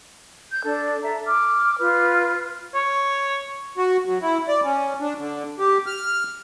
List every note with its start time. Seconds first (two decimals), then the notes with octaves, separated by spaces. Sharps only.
0.49 G6
0.63 D4 A4
1.02 A4 E5 A#5
1.26 D6 F6
1.79 F4 B4 F6
2.74 C#5
3.78 F#4
4.06 F#3
4.22 E4
4.48 D5
4.64 C#4
5.01 D4
5.18 D3
5.59 G4
5.86 F6